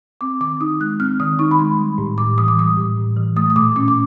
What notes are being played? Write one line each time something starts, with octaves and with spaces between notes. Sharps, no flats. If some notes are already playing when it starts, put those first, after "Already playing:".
C4 D6
D#3 D6
D#4 D#6
G#3 F#6
C4 F6
D#3 D#6
D#4 C#6
B5
G#3 C6
G3
A2
A2 D6
E3 D#6
D6
G3 D#6
A2
A2
E3
A3 D#6
D#6
A#2 D6
C#4 D6
D6